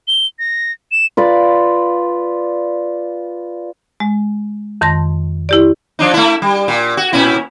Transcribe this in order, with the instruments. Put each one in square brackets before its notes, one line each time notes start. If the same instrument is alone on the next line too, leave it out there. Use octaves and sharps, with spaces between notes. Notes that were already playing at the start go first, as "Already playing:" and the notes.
[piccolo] G7
A#6
E7
[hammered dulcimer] F4 B4 D5
[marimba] G#3
F2 D#3 A5 C6 A#6
E4 G4 D5
[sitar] F3 D4 D#4
A3 E4
G3
A#2
F#4
A#2 C#4 E4